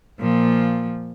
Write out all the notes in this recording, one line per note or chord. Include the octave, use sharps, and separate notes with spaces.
A#2 F3